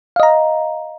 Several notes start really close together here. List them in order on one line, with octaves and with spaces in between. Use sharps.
F5 D#5 A#5